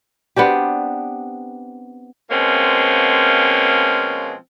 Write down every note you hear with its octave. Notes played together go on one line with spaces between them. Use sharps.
B3 C4 D4 G4
B2 F3 G#3 A#3 C4 C#4